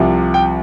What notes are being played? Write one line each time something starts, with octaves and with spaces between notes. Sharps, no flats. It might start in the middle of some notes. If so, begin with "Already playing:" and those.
Already playing: C2 C3 F3
G5